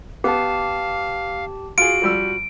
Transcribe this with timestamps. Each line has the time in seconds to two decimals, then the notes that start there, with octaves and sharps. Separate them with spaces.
0.24 B3 G4 F5 A5
1.78 F4 F#4 G#4 D7
2.02 F3 G3 E6